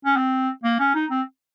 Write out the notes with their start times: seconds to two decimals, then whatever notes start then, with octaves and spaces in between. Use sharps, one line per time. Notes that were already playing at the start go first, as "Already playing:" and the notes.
0.05 C#4
0.16 C4
0.64 A#3
0.79 C#4
0.95 D#4
1.11 C4